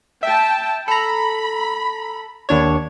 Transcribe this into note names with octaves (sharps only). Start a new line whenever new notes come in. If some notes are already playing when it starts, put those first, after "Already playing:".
E5 G5 A5
A4 A#5 B5
D#2 D4 C#5